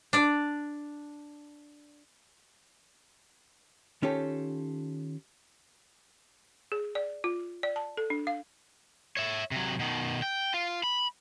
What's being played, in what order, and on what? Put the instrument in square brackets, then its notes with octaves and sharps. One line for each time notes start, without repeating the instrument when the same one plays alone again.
[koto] D4 D5
[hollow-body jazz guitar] D#3 C#4 F4 G4 A4
[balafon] G#4
D5
F4
D5
A5
A4
D4
F5
[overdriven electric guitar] C#5 E5
C3 F#3
B2 D#3
G5
F4
B5